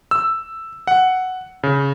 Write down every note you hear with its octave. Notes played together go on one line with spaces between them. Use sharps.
E6
F#5
C#3